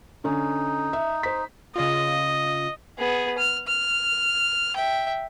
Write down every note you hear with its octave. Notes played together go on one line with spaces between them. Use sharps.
D3 C#4 D#4
E5
C5 B6
C#3 F4 D#5
B3 G#4
F6
F6
E5 G5